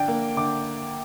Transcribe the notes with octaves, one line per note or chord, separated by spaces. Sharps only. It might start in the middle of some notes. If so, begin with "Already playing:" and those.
Already playing: D3 D4 G5
A#3
D3 D6